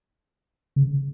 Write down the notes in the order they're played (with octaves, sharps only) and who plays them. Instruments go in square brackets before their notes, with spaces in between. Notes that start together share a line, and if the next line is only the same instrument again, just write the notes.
[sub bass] C#3